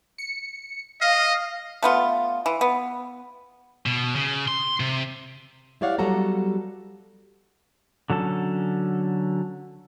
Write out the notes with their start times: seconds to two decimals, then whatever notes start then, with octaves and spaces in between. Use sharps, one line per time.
0.18 C#7
1.01 D#5 F5
1.82 A3 B3 F4
2.46 E3
2.61 B3
3.86 B2
4.16 C#3
4.48 C6
4.80 C3
5.81 E4 G4 C#5 D5 F5 F#5
5.99 F#3 G3 B3 F#4 A4 A#5
8.10 D3 F#3 C#4 A4